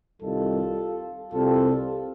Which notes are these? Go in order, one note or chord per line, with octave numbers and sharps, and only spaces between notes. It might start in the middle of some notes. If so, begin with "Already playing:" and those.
C2 C3 D#3 G3 F4 A4
C2 C3 G3 C4 F4 A4